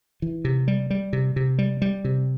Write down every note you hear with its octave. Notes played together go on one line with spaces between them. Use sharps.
E3
C3
G3
G3
C3
C3
G3
G3
C3